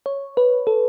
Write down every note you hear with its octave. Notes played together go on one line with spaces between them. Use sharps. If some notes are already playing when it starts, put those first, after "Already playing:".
C#5
B4
A4